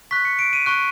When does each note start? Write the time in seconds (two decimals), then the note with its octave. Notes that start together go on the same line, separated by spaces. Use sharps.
0.11 C#6 F#6 B6
0.25 C#7
0.39 D7
0.53 D#7
0.66 C#6 F#6